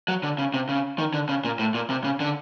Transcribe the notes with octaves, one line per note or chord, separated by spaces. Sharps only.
F#3
D3
C#3
C3
C#3
D#3
D3
C#3
A#2
A2
A#2
C3
C#3
D3